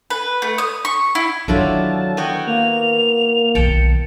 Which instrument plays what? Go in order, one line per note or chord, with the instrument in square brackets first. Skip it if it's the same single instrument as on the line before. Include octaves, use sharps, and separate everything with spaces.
[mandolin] B4
A3
D#6
C#6
E4
[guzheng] D3 E4 F4 [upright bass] D#3 C#4 [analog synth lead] F#3 [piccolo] A5
[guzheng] B3 F#4 C#5 [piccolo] G5
[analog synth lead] A#3 [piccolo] F7
[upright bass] B1 D#3 [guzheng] G5 A5 [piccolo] C#7